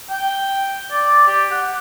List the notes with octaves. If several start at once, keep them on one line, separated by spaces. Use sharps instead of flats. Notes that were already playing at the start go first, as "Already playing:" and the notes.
G5
D5
G4
F#5